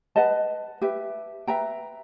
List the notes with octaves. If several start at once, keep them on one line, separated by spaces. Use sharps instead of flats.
B4 D#5 F#5 A5
G4 B4 E5
B4 E5 G5 A#5